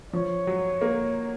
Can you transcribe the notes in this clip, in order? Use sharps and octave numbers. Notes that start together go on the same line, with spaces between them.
F3 C#5
F#3
A#3